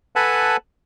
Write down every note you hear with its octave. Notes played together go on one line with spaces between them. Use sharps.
A4 B4 F#5 G#5 A5 B5